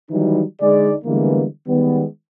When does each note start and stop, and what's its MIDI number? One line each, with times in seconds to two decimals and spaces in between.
0.10 0.42 51
0.10 0.42 52
0.10 0.42 54
0.10 0.42 55
0.10 0.42 63
0.61 0.93 50
0.61 0.93 56
0.61 0.93 63
0.61 0.93 68
0.61 0.93 74
1.05 1.45 50
1.05 1.45 52
1.05 1.45 55
1.05 1.45 56
1.05 1.45 58
1.05 1.45 59
1.68 2.04 51
1.68 2.04 55
1.68 2.04 56
1.68 2.04 59